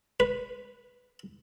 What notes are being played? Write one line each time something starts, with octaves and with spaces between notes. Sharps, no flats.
B4